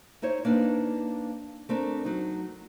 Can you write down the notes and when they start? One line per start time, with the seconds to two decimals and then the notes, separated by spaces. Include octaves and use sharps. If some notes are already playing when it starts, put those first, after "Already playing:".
0.22 D#4 E4 C5 C#5
0.45 A#3 D4 D#4 B4
1.69 A3 C4 D4 A#4
2.05 F#3 D#4